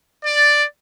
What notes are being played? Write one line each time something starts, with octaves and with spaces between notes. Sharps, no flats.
D5